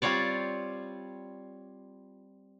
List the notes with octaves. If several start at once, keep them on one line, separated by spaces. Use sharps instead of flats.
G3 C4 F4 C#5 D5